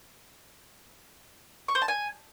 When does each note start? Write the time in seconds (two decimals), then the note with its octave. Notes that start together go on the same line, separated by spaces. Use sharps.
1.68 C#6
1.75 C5
1.82 A5
1.88 G#5